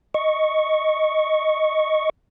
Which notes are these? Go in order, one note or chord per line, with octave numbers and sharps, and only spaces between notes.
D#5 C#6